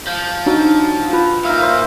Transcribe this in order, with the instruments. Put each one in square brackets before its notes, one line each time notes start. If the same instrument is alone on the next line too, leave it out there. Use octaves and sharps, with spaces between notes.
[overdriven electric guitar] F3 [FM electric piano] G6
[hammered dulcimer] F#3 [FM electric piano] D4 D#4 F#4
[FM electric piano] F4 [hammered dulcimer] B4
[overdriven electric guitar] A#2 F5 [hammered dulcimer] D#4 E5
[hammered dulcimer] C5